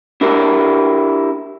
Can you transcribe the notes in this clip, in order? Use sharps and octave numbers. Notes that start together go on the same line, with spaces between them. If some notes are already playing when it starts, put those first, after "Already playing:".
D4 E4 G4 A#4